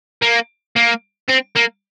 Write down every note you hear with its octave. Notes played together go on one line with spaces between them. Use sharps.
A#3
A#3
C4
A#3